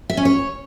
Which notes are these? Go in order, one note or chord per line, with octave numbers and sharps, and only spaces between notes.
E5
C#4
C#5